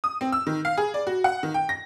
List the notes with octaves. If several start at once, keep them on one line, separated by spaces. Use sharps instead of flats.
D#6
C4
E6
D#3
F5
G#4
D5
F#4
F#5
D#3
G5
A#6